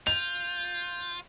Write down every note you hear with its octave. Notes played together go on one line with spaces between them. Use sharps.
F4 G6 F7